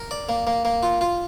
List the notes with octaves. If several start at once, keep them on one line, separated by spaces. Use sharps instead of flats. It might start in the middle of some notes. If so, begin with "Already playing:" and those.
Already playing: A#4
D5
A#3
A#3
A#3
F4
F4